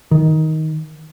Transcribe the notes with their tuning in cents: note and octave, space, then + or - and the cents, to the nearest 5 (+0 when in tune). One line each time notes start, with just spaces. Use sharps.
D#3 +15